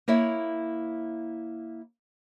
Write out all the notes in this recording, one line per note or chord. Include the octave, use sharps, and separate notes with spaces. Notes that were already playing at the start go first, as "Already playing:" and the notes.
A#3 E4 C#5 E5